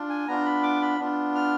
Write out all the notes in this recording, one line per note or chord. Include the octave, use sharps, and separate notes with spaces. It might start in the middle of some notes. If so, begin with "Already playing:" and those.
Already playing: D4 F4
G#5
B3 D4 F4 A#5
B5
D6
B5
B3 D4 F4
F6